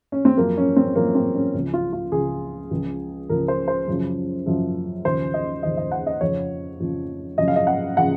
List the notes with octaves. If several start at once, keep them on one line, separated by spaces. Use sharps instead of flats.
C#4
C4
F#2 F3 A#3
C#4
C4
F#2 F3 A#3
C4
C#4
C#2 C#3 F3
F4
F4
C#2 C#3 F3 G#4
C#2 C#3 F3
C#2 C#3 F3 A#4
C5
C5
F#2 C#3 F3
F#2 C#3 F3
D#2 C#3 F3 C5
D#5
D#2 C#3 F3 D#5
D#5
F#5
D#5
F2 C#3 F3 C#5
F2 C#3 F3
F#2 C#3 F3 D#5
F5
D#5
F#5
C#3 F3 F#5